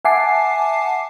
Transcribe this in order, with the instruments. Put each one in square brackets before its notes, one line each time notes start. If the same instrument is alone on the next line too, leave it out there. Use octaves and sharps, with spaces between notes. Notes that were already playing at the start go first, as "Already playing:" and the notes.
[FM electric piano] E5 F#5 G#5 A5 D6 C7